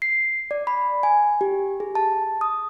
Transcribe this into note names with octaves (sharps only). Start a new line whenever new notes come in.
C7
D5
B5
G#5
G4
G#4
A5
D#6